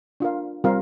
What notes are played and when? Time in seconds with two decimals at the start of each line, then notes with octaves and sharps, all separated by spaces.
0.20 D4 F4 A#4 F5
0.64 G3 C4 F4 A#4 F5